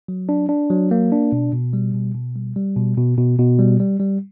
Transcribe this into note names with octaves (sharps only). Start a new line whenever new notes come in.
F#3
D4
D4
F#3
A#3
D4
B2
B2
G3
B2
B2
G3
G3
B2
B2
B2
B2
G3
G3
G3